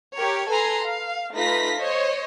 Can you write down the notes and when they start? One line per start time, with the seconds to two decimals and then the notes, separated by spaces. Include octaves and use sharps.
0.16 G4 A#4 C#5
0.49 A4 B4 G#5 A#5 C6
0.84 F5
1.33 A3 D#4 F4 B4 A#6 B6
1.79 C5 C#5 D#5